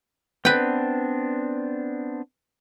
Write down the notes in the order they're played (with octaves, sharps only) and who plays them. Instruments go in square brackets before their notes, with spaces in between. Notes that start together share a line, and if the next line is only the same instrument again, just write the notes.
[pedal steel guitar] B3 C4 D4 [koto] B4 G5